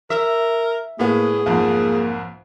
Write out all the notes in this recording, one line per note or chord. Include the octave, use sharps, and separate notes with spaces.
A#4 E5
A2 A#3 B3 G#4
B1 F2 G#2 A#3